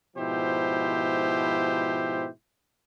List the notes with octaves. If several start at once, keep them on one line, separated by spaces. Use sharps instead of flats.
G#2 B2 F3 E4 G4 C5